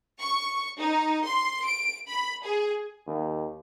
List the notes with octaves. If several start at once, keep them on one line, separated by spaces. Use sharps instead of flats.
C#6
D#4
C6
D7
B5
G#4
D#2